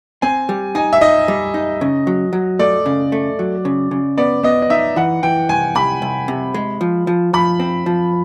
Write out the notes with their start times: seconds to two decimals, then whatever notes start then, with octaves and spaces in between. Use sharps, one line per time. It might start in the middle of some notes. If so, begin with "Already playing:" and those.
0.22 C4 G#5
0.49 G3
0.75 D#4 G#5
0.93 E5
1.01 D#4 D#5
1.28 G3
1.54 D#4
1.81 C#3
2.07 F#3
2.33 F#3
2.59 A3 D5
2.86 C#3
3.12 A3
3.39 F#3
3.65 C#3
3.91 C#3
4.18 B3 D5
4.43 B3 D#5
4.62 D#5
4.70 D#4 E5
4.96 E3 F#5
5.23 E3 G5
5.49 C2 G#5
5.75 C2 B5
6.02 C2
6.28 C3
6.54 G#3
6.81 F3
7.07 F3
7.33 F3 B5
7.60 C4
7.86 F3